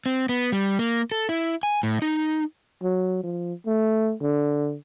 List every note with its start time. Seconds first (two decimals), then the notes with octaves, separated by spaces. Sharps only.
0.06 C4
0.29 B3
0.52 G3
0.79 A#3
1.12 A4
1.29 E4
1.63 G#5
1.83 A2
2.02 D#4
2.83 F#3
3.24 F3
3.67 A3
4.21 D3